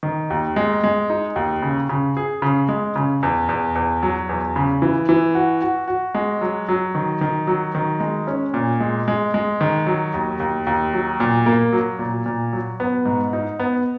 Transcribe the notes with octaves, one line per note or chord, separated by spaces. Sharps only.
D#3
D#2
G#3
G#3
D#4
D#2
C#3
C#3
G#4
C#3
G#3
C#3
E2
E2
E2
F#3
E2
C#3
E3
E3
F#4
F#4
F#4
G#3
F#3
F#3
D#3
D#3
F#3
D#3
G#3
C#4
A#2
G#3
G#3
G#3
D#3
F#3
D#2
D#2
D#2
F#3
A#2
A#3
F#3
A#2
A#2
F#3
B3
G#2
D#4
B3